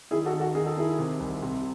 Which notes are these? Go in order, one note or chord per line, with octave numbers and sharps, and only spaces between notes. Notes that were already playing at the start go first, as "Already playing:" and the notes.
D#3 E4 G#4
F#4 A4
D#3
F#4 A4
D#3 G#4
A4
D#3 E4 G#4
C3
C2
C3